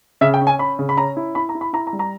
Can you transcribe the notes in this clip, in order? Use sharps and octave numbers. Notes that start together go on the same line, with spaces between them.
C#3 E5
G5
C#4
G#5
C#4 B5
C#3
B5
C#4 A#5
E4
E4 B5
A#5
E4
B5
E4 A#5
A#5
G3
A#5